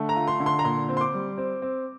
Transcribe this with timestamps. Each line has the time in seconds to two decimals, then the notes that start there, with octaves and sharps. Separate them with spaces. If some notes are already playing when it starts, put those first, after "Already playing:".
Already playing: D3 A3
0.09 A#5
0.16 F4
0.28 C6
0.40 D3
0.46 C6
0.59 A#5
0.64 A#2 C6
0.89 C4
0.97 C6
1.01 D6
1.14 G3
1.38 C4
1.62 C4